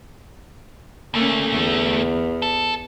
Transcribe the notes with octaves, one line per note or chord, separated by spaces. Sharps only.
D2 A3 A#3 C#4
E2
A4